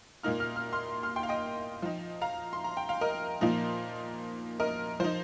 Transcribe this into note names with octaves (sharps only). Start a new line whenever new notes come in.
A#2 A#3 D#4 F6
F6
F6
C6 F6
C6 F6
G5 C6
F5
D#5 G5
F3 D#4
F5 A#5
C6
A#5
G5
F5
A#4 D#5
A#2 F3 D#4
A#4 D#5
F3 D#4 C5